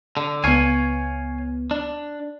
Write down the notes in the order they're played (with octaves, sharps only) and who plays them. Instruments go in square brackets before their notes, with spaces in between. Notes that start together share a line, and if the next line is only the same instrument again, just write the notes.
[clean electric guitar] D3
[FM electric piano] C#2 B3 [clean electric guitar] C#5 F5 G#5
[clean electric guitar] D4